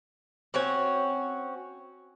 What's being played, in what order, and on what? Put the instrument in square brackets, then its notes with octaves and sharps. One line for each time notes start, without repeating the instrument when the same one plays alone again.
[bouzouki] C4 C#4 F#4 C#5